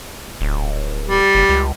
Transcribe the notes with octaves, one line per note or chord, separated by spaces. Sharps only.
D1
G3
F#1
C#2